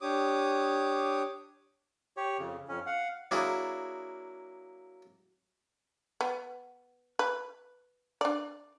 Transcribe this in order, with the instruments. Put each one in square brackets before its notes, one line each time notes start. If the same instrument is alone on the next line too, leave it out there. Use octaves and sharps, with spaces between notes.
[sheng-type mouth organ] D4 G4 C#5 D6 D#6
[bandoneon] G4 C#5
F2 C#3
F2 C#4
F5 F#5
[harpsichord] F#3 A#3 D4 E4 G#4
[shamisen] B3
B4
D4 D5